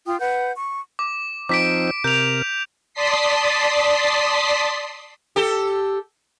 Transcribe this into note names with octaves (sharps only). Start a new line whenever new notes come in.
F4 G5 D#6
B4 F#5 G6
C#6
D6
F3 C4 D#4 D6 B6 D7
C3 A#4 G6 F7
D5 A5 C6 D#6 B6 C7
G4 A4